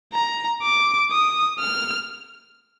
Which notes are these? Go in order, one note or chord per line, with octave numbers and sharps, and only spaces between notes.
A#5
D6
D#6
F6